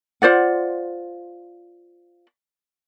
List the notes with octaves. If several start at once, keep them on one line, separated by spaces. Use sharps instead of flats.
F4 C5 D5 F#5